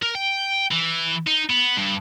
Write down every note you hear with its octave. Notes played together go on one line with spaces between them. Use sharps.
A#4
G5
E3
D#4
B3
G2